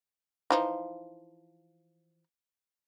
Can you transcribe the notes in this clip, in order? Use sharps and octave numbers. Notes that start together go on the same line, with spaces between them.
E3 F3 D#4